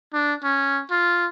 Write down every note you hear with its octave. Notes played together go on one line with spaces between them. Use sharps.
D4
C#4
F4